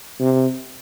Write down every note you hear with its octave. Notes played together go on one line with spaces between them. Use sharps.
C3